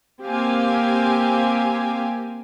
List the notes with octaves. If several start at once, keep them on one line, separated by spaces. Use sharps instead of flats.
A#3 C4 G4 F5 G#5